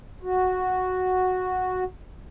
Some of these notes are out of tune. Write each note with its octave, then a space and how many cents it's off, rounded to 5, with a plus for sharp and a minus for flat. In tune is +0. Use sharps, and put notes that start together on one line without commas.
F#4 -5